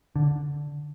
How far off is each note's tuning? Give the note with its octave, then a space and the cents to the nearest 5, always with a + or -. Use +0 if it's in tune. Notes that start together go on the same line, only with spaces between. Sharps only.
D3 -5